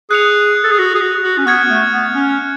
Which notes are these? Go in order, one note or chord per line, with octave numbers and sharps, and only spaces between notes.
G#4 F#6 C#7 F7
A4
G#4
F#4
G#4
F#4
F#4
C#4
B3 C#6 F6 G#6 C#7
A3
B3
C#4